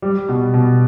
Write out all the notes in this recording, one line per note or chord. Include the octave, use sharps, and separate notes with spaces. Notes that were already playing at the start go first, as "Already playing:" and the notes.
G3
B2
B2